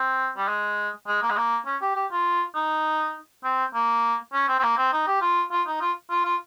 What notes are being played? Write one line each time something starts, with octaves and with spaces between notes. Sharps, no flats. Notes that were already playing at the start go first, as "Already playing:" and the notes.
Already playing: C4
G3
G#3
G#3
A#3
G#3
A#3
C#4
G4
G4
F4
D#4
C4
A#3
C#4
C4
C4
A#3
C4
D#4
G4
F4
F4
D#4
F4
F4
F4